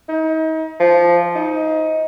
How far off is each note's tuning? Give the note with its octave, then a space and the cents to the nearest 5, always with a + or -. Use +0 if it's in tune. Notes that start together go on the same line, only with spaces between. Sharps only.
D#4 +35
F3 -10
D#4 +20